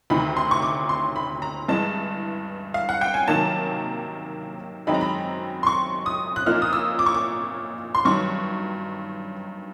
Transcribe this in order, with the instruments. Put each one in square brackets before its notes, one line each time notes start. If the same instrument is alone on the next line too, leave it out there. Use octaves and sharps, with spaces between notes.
[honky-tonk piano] D2 C3 D#3 B5
C6
C#6
D6
C6
B5
A#5
G2 E3 G#3 A5
F5
F#5
G5
G#5
C3 D#3 F#3 A#3 A5
F#2 D#3 G#3 C4 D#4 B5
A#5
B5
C6
C#6
D#6
F#6
A#2 F3 A#3 D#4 F6
D#6
E6
D6
C#6
D6
C6
G2 D#3 F#3 C#6